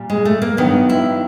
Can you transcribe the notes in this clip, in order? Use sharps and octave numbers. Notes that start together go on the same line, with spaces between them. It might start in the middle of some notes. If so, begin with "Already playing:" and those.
Already playing: A#2 G3
G#3
A3
A#3
G2 D#3 F#3 B3
E4